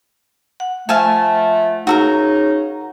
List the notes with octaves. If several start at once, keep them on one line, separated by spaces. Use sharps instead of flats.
F#5
F3 A3 F5 G#5 A5
C#3 D#4 F#4 A4 A#4